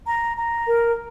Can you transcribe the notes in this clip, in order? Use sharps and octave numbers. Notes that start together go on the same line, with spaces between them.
A#5
A#5
A#4